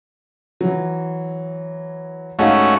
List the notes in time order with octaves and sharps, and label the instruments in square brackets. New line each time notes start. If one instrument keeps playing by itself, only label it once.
[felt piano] E3 F#3
[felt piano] G#2 D#4 F5 [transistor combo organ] A3 C#4 F#4